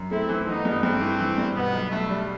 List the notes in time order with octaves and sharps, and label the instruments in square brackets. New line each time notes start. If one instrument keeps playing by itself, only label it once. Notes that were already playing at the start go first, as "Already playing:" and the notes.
Already playing: [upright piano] F#2
[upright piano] A3 [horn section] C4 E4
[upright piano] E3
[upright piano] E3 [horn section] B3 D#4
[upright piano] G2
[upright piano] G2 [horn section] A3 C4
[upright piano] E3
E3
G2
[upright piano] B2 [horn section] B3
[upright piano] B1
[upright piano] B1 [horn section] A3
[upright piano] G3